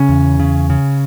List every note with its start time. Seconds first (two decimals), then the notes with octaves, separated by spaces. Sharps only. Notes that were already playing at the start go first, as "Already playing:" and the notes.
Already playing: C#3 C#4
0.09 E2
0.40 C#3
0.70 C#3